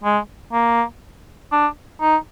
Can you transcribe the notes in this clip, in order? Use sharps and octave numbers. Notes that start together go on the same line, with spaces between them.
G#3
A#3
D4
D#4